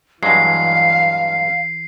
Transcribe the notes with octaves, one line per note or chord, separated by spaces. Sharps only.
G2 E3 F#3 G#3 F5 C7